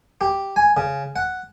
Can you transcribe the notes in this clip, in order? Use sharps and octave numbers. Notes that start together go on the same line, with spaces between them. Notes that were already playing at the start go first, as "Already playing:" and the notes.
G4
G#5
C#3
F#5